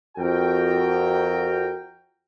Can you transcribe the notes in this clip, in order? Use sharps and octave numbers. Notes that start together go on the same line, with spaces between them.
F2 F#4 A#4 G5